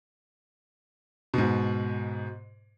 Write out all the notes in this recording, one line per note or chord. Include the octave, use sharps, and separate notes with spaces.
G#2 B2